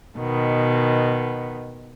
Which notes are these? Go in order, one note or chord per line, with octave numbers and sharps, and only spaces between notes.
B2 D#3 B3